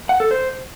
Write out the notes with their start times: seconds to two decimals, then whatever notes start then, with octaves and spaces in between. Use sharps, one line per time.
0.09 F#5
0.20 A4
0.31 C5